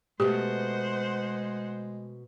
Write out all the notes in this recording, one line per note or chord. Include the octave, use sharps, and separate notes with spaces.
B2 G#3 A3 G4 C5 F#5